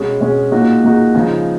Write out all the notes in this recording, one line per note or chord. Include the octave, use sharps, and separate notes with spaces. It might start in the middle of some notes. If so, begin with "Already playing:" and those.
Already playing: B2 G#3 C#4 G#4
B2 G#3 C#4 G#4
A#2 G#3 D#4 F#4
A#2 G#3 D#4 F#4
C#3 F3 G#3 D#4